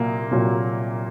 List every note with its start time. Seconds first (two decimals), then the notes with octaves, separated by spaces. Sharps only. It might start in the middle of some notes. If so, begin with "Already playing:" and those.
Already playing: C2 A#2 F#3 A#3
0.31 C2 A#2 F#3